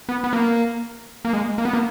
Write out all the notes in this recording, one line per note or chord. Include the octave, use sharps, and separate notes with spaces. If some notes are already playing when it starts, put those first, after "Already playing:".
B3
B3
A#3
A#3
G#3
A#3
B3
A#3